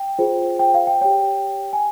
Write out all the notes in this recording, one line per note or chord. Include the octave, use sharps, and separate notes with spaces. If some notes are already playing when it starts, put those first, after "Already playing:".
Already playing: G5
F4 G#4 C5
G5
F5
G5
G4 C#5 G5
G#5